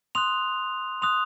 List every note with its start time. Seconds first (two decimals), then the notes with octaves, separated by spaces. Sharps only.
0.15 C6 D#6 F#6 F7
1.02 C6 D#6 F#6 F7